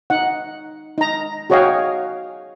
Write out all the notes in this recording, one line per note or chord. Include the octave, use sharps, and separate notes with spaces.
D#4 F#5
D#4 A#5
F#4 G#4 C#5 D#5 F5 G5